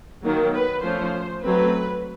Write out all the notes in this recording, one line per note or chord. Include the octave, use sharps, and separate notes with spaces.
D#3 F#3 A#3
B4
F3 A3 C#4 C5
F#3 A3 C4 B4